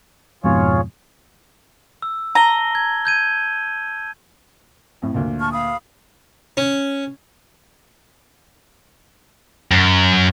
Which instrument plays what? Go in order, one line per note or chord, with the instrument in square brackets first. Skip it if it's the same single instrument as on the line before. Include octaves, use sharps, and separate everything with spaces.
[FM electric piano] F2 G#2 B2 [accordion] F4 G#4 C#5
[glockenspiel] E6
[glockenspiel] A5 G7 [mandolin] A#5
[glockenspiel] G#6
G6 G#6 D#7
[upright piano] F2 A2
D2 A#2
[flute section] A5 C#6 F6
F5 B5 D#6
[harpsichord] C#4
[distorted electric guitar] F#2